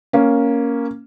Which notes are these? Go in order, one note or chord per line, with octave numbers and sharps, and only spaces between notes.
A#3 C#4